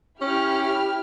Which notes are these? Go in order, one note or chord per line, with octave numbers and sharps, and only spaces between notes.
C#4 E4 G4 F6